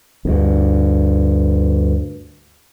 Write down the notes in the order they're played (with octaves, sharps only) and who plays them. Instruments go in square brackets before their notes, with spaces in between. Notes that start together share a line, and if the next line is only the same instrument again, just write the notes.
[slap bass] D2 G2